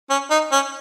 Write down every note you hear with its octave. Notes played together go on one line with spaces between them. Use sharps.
C#4
D#4
C#4